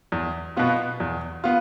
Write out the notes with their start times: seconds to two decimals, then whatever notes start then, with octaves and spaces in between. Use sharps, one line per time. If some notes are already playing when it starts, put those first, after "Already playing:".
0.12 E2
0.57 B2 B3 F4
1.00 E2
1.44 B3 F4